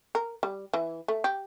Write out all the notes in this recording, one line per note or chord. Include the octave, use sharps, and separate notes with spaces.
A#4
G3
E3
A3
G4